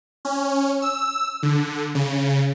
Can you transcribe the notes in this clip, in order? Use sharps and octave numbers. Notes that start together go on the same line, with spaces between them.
C#4
E6
D3
C#3